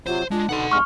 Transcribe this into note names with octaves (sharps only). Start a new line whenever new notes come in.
C3 F#3 F4 C5
G#3 D4 F4
B2 D3 B3 D#4 F#5 C6
E2 G2 G#3 C#6 F6